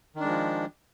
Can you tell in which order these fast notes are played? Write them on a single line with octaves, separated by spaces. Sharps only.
D#3 D4 G#3 F3